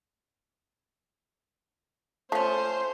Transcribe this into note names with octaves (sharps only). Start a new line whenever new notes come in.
F3 A3 C#4 C5